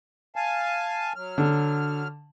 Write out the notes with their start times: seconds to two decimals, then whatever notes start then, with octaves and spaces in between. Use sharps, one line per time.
0.36 F5 G#5 A5
1.16 F#3 F6
1.38 D3